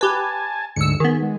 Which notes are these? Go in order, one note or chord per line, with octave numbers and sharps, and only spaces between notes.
G4 B4 G#5 A5
D2 G#2 E6 C#7
D#3 B3 G#4
G#3